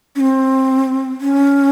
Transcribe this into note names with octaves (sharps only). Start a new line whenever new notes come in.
C#4
C4
C#4